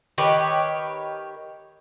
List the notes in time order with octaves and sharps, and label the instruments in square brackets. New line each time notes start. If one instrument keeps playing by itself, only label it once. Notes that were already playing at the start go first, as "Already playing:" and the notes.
[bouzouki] D#3 G4 B4 C#5